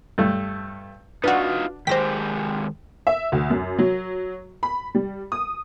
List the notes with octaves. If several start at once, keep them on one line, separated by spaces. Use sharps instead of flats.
G2 A3
D4 D#4 F4 F#4 B4
D#3 G#3 G4 C5 G5 A#6 B6
E5
D2
F#2
F#3
B5
G3
D#6